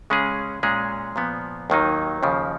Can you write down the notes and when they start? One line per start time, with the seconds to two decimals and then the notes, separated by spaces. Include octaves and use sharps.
0.10 C#3 G#3 C#4 G#4
0.63 A#2 G#3 C#4 G#4
1.16 A#2 F3 B3
1.70 D#2 D#3 F#3 A#3 D#4
2.23 D#2 C#3 F3